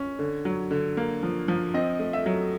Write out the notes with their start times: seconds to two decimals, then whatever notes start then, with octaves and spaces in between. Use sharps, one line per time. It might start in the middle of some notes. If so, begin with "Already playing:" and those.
Already playing: C#4
0.19 D3
0.45 F#3
0.71 D3
0.97 A#3
1.23 F3
1.48 F3
1.74 C4 D#5
2.00 A3
2.13 E5
2.26 F#3